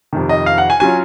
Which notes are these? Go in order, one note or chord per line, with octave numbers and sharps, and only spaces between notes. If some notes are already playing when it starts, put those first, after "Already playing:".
F2 C3 D#3
D#5
F5
F#5
G#5
F#3 C#4 F4 G#5